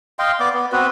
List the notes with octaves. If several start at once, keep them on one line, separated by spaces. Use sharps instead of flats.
D#5 F5 G5 C6
B3 D5 D6
B3
B3 C4 F#4 B4